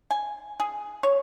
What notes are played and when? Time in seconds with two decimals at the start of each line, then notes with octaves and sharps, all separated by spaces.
0.11 G#5
0.60 G#4
1.03 C#5